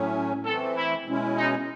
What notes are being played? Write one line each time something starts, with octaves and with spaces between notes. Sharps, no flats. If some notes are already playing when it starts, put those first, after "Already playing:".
Already playing: A2 F#3 A3 C#4
E3 A3 C4 A4
E4
B2 G#3 C#4 E4
D#4